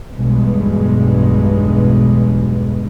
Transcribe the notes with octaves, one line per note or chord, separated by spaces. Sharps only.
B1 E2 G2 B2 G#3 B3